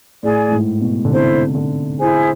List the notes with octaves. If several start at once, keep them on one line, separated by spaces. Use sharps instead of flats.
A2 G#4 D5 G#5
A2
G#2
B2
D3
C3 E4 A4 C5
D3
E4 G#4 C5 G#5